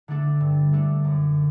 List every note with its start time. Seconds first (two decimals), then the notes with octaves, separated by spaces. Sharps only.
0.08 D3 A3 D4 A4
0.40 G2
0.73 D3 A3 D4 A4
1.04 F#2